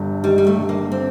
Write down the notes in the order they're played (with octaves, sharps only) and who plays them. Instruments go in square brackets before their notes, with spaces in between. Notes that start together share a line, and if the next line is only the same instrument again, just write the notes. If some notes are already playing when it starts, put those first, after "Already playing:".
Already playing: [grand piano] G1 G2
[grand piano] D#3 [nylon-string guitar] G3
[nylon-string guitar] G3
A3
[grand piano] G2
[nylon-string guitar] A#3
C4